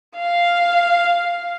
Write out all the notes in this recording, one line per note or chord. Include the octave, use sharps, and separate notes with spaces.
F5